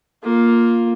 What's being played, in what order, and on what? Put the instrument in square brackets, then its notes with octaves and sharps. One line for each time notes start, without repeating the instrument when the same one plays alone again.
[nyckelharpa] A#3 F4